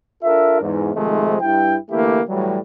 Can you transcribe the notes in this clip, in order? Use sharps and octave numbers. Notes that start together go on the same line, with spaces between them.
D4 F4 A4 A#4 E5
E2 G#2
G#2 C3 D#3 F3 G#3 A3
G2 E4 G5
D3 E3 A3 A#3 E4 G4
A2 E3 F#3 G3